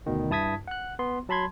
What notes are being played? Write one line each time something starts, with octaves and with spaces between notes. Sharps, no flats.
D2 B2 D#3
G2 E4 A5 D#6 G#6 B6
F#5 F#6
B3 C6
F#3 A5 B5 C6 G#6